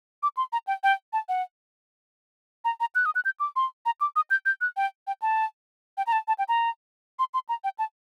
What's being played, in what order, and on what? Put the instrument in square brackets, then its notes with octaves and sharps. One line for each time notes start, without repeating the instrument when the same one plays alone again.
[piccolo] D6
C6
A#5
G5
G5
A5
F#5
A#5
A#5
F#6
D#6
F#6
G6
D6
C6
A#5
D6
D#6
G6
G6
F#6
G5
G5
A5
G5
A#5
A5
A5
G5
A#5
C6
C6
A#5
G5
A5